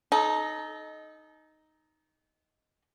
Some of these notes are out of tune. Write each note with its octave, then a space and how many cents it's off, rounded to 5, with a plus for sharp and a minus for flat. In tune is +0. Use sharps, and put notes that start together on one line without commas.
D#4 +0 A4 -35